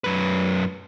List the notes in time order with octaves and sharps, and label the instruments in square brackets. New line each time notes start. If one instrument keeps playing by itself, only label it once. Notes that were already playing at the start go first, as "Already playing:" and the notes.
[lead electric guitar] F#2 B4